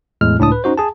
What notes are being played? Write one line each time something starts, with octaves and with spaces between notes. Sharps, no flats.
E2 A2 G#3 F6
C#2 A2 D4 A5 D#6
B4
C#4 D#4 F#4 C5
G#4 A5